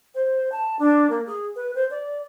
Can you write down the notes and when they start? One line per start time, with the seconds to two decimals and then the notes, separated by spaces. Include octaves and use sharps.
0.15 C5
0.52 A5
0.79 D4
1.10 A#3
1.26 G#4
1.56 B4
1.75 C5
1.91 D5